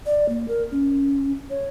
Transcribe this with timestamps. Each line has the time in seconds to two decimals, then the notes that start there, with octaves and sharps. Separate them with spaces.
0.06 D5
0.29 A#3
0.48 A#4
0.71 C#4
1.50 C#5